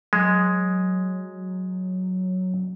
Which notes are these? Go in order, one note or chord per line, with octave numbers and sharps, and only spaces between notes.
F#3 G#3